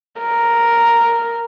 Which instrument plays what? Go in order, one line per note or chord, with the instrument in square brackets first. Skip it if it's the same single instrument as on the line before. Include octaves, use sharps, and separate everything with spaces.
[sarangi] A#4